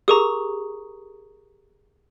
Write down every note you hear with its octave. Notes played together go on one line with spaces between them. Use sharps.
G4 G#4 A#4 A#5 C#6 D#6